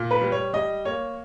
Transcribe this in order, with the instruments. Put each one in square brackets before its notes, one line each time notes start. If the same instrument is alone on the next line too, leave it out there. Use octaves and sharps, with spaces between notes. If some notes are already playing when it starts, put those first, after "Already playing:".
Already playing: [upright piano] A#2
B4
G3
C#5
G3 D#5
A#3 C#5